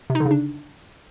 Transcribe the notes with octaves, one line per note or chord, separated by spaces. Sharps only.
C3
D#4
D3
C#3
D4